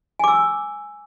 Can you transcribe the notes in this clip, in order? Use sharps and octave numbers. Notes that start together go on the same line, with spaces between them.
G#5 D6 E6